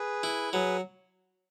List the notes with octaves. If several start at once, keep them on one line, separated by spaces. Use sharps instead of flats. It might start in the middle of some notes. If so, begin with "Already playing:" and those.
Already playing: G#4 B4
E4
F#3 G#4 B4